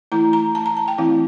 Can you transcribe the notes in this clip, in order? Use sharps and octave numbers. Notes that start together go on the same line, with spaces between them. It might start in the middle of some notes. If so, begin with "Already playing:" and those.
E3 A3 E4 A#5
A#5
A5
A#5
A5
G5
E3 A3 C4 E4 F5